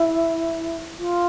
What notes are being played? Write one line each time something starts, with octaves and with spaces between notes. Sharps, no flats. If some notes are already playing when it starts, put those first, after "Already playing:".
Already playing: E4
F4